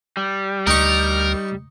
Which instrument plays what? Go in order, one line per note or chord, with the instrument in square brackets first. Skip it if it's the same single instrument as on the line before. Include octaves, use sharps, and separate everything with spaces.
[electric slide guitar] G3
[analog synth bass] D2 [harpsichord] D#4 C#6 [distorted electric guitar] A#4